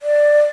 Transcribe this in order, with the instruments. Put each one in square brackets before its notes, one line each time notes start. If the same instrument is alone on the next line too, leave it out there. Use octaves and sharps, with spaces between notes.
[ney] D5